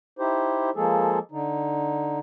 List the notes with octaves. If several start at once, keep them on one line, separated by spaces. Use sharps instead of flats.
D#4 E4 G4 C5
F3 G#3 A#3 G#4 A4
D3 D#4